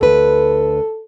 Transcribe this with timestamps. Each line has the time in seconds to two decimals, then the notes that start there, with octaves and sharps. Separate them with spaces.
0.01 D2 A4 B4